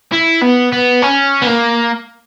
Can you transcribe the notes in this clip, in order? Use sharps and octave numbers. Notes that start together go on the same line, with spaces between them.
E4
B3
B3
C#4
B3
A#3